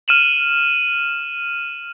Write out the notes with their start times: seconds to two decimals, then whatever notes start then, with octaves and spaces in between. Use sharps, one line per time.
0.08 F6 D#7 E7 F#7